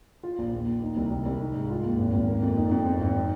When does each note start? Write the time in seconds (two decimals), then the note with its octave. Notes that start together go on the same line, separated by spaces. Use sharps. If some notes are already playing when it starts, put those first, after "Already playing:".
0.23 F4
0.38 A#1
0.53 D#2
0.68 D#2
0.82 D#4
0.97 C2
1.11 C2
1.26 C2
1.40 D#4
1.55 G#2
1.70 F4
1.84 D#2
1.98 G#1
2.13 G#1
2.28 A#3
2.42 F2
2.57 D#4
2.71 F2
2.86 C4
3.01 G#1
3.15 D#4